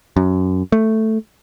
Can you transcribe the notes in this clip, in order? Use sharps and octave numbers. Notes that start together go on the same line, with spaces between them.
F#2
A3